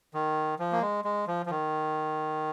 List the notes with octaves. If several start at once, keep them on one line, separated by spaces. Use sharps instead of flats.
D#3
F3
A#3
G#3
G#3
F3
F3
D#3